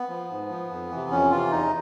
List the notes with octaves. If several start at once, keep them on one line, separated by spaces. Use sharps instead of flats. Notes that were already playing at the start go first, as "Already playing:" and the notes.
Already playing: B3
F3
G#2
F3
F2
C3 E3
F2 C#4
C3 E3 F4
E2 D#4